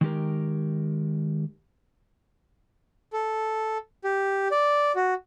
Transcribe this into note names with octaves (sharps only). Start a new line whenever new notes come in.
D#3 G#3 G4 A#4
A4
G4
D5
F#4